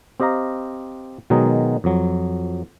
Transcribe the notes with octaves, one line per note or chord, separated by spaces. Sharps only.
C4 G4 D#5 F5 A#5
B2 D#3 F#3 G#3 D#4
F2 F#3